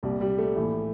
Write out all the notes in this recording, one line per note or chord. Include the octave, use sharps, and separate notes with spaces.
C2 A#2 G3
G3
A3
A#1 A2 E3